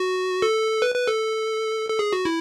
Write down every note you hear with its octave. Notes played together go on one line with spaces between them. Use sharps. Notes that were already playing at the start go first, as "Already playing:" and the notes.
Already playing: F#4
A4
B4
B4
A4
A4
G#4
F#4
E4